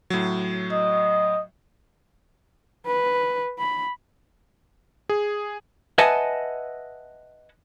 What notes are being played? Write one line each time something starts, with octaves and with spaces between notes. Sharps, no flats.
A2 F#3
D#5
B4
B5
G#4
B4 D#5 E5 F#5 G#5 A5